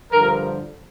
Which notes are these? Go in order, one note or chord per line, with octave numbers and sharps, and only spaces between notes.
G2 D3 F3 A#4